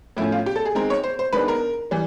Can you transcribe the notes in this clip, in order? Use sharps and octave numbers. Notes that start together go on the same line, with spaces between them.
A2 F3 A3 C#4 E4
F4
G4
A4
G#4
D#3 G#3 C4 A#4
C#5
C5
C5
D#3 G#3 B3 D4 B4
A#4
E3 G3